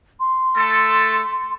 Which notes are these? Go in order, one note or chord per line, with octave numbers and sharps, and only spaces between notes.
C6
A3 A4